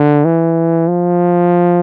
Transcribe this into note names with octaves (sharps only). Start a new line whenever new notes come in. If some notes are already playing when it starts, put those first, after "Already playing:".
Already playing: D3
E3
F3